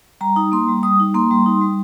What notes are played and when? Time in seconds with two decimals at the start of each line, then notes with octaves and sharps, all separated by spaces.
0.21 G3 A#5
0.36 D#4
0.52 A#3 C6
0.68 G3
0.83 G3 D#6
1.00 D#4
1.14 A#3 C6
1.31 G3
1.46 D#4
1.61 G3